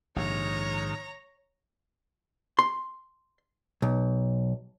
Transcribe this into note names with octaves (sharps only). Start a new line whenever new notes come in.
A#1 G#2 C3 D#3 C#5 A#5
C6
B1